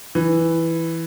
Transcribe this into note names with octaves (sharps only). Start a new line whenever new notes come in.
E3